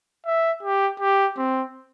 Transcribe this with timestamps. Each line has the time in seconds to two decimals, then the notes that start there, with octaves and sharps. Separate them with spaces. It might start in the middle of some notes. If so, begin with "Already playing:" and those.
0.26 E5
0.63 G4
1.00 G4
1.38 C4